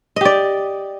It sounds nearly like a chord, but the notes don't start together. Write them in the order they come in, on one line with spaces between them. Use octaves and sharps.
D#5 G4 D5